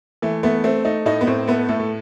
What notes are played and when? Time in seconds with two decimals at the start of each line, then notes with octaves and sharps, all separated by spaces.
0.22 E3 A3
0.43 A3 B3
0.64 A3 C4
0.85 A3 D#4
1.06 A2 D#4
1.21 B3
1.27 A2 C4
1.48 A3 B3
1.69 A2 A3
1.79 A3